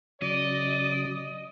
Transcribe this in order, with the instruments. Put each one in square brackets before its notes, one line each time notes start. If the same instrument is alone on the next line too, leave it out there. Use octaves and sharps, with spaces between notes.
[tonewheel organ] C#3 F#3 [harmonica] D5 [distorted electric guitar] D#5